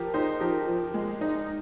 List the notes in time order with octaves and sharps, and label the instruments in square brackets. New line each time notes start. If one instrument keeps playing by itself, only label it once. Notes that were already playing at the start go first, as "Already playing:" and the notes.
Already playing: [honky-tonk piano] F3 [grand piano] G4 A#4
[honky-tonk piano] D#4 [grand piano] G#4 C5
[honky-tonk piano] F3 [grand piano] G4 A#4
[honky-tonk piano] F3
G#3
D#4